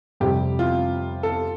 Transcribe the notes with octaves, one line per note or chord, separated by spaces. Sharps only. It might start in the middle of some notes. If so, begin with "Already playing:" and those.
F2 C3 G3 G4
F4
A4